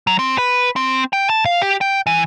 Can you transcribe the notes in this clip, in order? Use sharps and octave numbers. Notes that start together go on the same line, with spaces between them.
F#3
C4
B4
C4
G5
A5
F5
G4
G5
E3